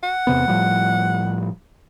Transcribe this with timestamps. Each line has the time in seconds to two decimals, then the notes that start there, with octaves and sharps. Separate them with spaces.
0.03 F#5
0.27 E2 C3 B3
0.48 A2 F3 G3